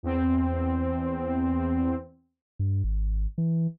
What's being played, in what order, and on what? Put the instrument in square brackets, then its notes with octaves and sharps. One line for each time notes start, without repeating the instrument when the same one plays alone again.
[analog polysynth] E2 C4
[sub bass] G2
G#1
E3